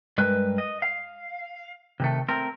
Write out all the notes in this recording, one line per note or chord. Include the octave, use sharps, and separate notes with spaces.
G2 G#3 A#4 B4
D#5
F5
C3 D#3 A3
A3 C4 A#4